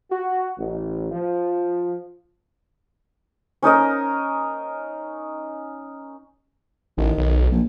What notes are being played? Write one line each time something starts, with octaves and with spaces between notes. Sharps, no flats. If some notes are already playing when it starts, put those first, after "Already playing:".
F#4
A1
F3
C#4 D#4 A#4 D#5
A1 D#3
B1
A#1